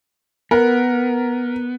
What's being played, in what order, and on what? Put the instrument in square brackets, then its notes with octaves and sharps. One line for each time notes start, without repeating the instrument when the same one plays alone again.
[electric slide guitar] B3 [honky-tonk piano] A#4